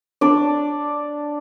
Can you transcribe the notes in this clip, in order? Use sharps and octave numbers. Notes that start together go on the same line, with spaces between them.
D4 D5